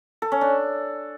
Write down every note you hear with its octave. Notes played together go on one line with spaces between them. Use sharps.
A4
C#4
D4